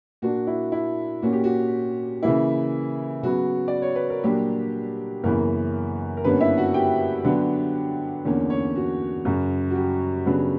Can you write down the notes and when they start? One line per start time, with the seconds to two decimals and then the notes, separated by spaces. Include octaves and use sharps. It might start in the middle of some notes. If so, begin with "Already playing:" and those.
0.22 A#2 A#3 D4 F#4
0.47 E4
0.72 E4
1.22 A#2 A#3 C#4 F#4
1.33 G4
1.44 F#4
2.23 C#3 E3 A#3 E4
3.23 C#3 F#3 B3 F#4
3.68 D5
3.82 C#5
3.95 B4
4.10 A#4
4.23 A#2 F#3 G3 A#3 D4 G4
5.23 F#2 C#3 E3 A#3 B3 A#4
6.17 A#4
6.24 G2 D3 A#3 B3 C#4 B4
6.40 E4 E5
6.57 F#4 F#5
6.74 G4 G5
7.24 D3 F#3 B3 D4
8.25 E2 D3 A#3 C#4
8.50 C#4 C#5
8.75 F#4
9.25 F#2 C#3 F#3
9.70 F#4
9.75 G3 G4
10.26 C#3 F#3 B3 D4